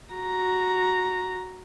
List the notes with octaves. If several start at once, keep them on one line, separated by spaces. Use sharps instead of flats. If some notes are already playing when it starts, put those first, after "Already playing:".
F#4 A#5